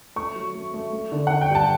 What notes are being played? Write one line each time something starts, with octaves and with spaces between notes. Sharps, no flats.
A3 C#6
F#3
A3
A3
A3
D3
D3 F#5
G5
G2 A5